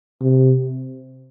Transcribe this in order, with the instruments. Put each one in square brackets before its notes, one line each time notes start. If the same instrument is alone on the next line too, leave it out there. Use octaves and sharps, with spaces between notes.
[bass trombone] C3